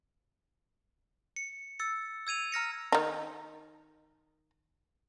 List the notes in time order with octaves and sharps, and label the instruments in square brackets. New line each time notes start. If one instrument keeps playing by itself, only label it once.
[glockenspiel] C#7
E6 A6 C#7
E6 G#6 D#7 F7
A#5 F6 A#6 C#7
[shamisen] D#3 D#4